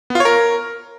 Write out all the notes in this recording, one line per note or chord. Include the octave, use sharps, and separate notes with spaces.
B3
F4
C#5
A#4